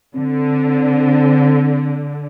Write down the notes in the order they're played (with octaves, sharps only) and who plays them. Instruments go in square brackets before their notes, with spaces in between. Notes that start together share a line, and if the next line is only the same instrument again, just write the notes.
[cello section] D3 [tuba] C4